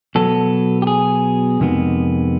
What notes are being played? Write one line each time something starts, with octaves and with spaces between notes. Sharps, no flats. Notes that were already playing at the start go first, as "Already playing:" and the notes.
B2 F#3 B3 A4
G4
G#4
F2 C3 D#3 G#3 B3